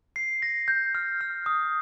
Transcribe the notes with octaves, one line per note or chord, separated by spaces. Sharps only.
C7
A#6
G6
F6
F6
D#6